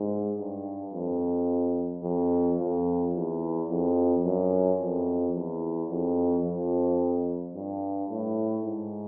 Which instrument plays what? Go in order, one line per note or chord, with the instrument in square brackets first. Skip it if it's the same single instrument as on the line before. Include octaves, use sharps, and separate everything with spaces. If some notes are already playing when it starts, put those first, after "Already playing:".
Already playing: [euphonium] G#2
G2
F2
F2
F2
E2
F2
F#2
F2
E2
F2
F2
G2
A2
G#2